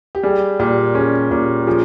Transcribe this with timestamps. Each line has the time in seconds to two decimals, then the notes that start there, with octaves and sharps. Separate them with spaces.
0.15 G4
0.23 G3 G#4
0.59 A#2 G4
0.95 C#4 G#4
1.31 A#2 G4
1.59 G4
1.67 F3 G#4